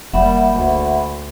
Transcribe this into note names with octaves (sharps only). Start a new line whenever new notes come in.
F1 G3 A#3 E5 F#5 B5
D2